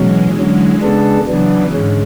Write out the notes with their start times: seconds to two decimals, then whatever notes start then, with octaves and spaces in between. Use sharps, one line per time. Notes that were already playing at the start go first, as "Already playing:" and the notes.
Already playing: B2 E3 F#3 G#3 C#4
0.36 D3 F#3 C#4
0.82 C#3 G#3 B3 D4 A4
1.27 C#3 E3 F#3 B3 D4
1.72 G#2 D3 G#3 C#4